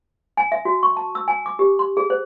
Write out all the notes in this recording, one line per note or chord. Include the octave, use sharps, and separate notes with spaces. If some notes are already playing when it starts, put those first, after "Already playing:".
G#5
E5
F#4
C#6
A5
E6
G#5
D6
G4
C6
G#4
C5